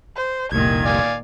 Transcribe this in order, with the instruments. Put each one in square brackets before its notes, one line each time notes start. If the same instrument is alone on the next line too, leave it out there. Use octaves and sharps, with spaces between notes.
[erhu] C5
[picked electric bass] F1 C2 [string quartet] A#2 D#3 [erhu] G#6
[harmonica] D5 F5 G#5